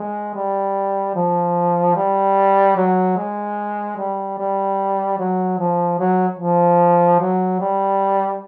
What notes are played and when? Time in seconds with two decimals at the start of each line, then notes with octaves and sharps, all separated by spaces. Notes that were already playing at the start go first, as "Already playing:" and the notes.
Already playing: G#3
0.34 G3
1.15 F3
1.95 G3
2.76 F#3
3.17 G#3
3.97 G3
4.38 G3
5.18 F#3
5.58 F3
5.99 F#3
6.39 F3
7.20 F#3
7.60 G3